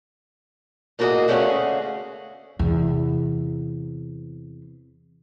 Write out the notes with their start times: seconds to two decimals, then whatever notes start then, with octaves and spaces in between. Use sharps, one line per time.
0.99 A2 A#3 E4 F#4 G#4 D#5
1.28 D2 A3 C#4 G#4 F5 F#5
2.59 E2 C3